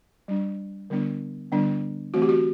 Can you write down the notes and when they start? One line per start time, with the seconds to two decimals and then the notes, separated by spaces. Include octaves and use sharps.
0.28 G3 D4
0.90 D3 G3 B3 D4
1.52 D3 G3 B3 D4
2.14 E3 A3 C4 F#4
2.22 G4
2.29 F#4